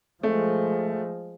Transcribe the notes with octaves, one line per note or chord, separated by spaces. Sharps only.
F3 G#3 A3